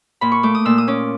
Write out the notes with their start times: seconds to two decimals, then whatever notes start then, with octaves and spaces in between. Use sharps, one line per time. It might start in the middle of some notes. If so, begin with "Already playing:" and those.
0.21 A#2 B5
0.32 C#6
0.43 A3 D6
0.55 D#6
0.65 A#2 E6
0.78 D#6
0.88 C#4 D6